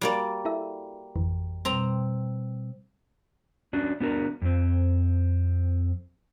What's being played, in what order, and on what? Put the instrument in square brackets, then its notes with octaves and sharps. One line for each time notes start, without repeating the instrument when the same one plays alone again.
[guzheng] G3 A#3 D5 [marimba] F#4
[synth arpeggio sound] E4 A4 E5
G#1 F2 E3
[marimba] B2 G3 [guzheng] C4 A#5
[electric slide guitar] C#4 D4 F#4
B3 D4 F#4 A#4
F2 C4